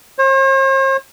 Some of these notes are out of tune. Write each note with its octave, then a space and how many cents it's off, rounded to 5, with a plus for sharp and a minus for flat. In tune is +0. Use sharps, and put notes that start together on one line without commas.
C5 +45